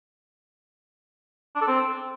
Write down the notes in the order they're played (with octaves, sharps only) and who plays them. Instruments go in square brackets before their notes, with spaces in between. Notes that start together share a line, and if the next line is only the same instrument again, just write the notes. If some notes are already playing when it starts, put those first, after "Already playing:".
[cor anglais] D4
A4
C4